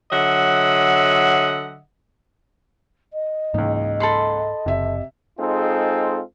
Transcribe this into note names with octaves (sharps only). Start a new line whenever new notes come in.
D3 F#3 D#5 E5 F#5
D#5
C#2 G#2 E3 A#3 D#4
A4 B5 C6
F#1 C3 E5
G#3 C4 D#4 F4 G#4 A4